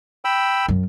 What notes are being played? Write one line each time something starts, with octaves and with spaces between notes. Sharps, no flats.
G5 B5 E6
F#2